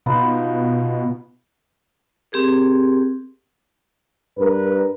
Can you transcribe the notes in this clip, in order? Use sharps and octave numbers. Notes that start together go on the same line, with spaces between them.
B2 B3 D#4 F4
C4 G4 G#4 A#4
G2 A#4 B4